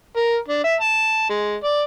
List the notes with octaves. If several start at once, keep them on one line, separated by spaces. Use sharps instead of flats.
A#4
D4
E5
A5
G#3
D5